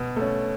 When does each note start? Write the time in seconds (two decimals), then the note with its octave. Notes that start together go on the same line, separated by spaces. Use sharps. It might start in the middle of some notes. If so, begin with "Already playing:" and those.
Already playing: B2
0.16 A3
0.21 C#4